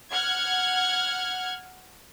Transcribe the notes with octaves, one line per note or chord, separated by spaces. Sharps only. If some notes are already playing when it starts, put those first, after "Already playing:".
F#5 F6 G#6